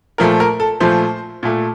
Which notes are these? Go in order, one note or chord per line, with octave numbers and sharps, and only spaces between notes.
A#2 F3 A3 A#4
A#4
A4
A#2 F3 A3 C5
A#2 A3